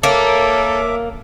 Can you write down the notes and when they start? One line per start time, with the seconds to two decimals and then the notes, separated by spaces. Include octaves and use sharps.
0.03 A#3 A4 C#5 E5 D6